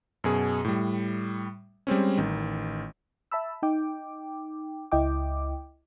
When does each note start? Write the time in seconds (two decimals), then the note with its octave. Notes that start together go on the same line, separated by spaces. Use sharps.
0.24 F#2 B2 G#4
0.64 A2 G3
1.87 G3 G#3 C4 C#4
2.17 A1 D#3
3.32 E5 A5 B5 E6
3.63 D#4 G5 D6
4.92 C#2 E4 D#5 G5 D6